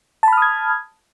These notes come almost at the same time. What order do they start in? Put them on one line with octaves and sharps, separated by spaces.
A5 B5 F6 D#6 G#6